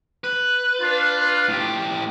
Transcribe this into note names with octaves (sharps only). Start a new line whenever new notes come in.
B4
D4 F4
A2 G4